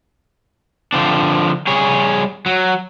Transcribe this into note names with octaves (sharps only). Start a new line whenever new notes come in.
D3 F3 C4 D4
G3 G#4 C#5
F#3